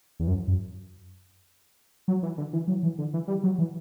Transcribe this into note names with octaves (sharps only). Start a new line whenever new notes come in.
E2
F#2
F#2
F#3
E3
D3
E3
F#3
E3
D3
E3
G3
F#3
E3